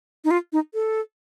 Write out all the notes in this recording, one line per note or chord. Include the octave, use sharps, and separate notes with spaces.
D#4
F4
D#4
A4